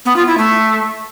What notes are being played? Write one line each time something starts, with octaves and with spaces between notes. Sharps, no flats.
B3
F4
E4
A3